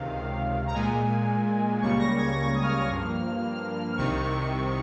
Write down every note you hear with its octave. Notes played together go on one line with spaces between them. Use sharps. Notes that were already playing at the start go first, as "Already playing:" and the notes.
Already playing: C#2 C3 D#3 F5
A#5
A#2 G#3 G#5
C#2 C#3 G3 A#3 C#6
A#6
G#6
A#6
D#6
F6
G2 F3 A#3
C2 C3 D#3 C#6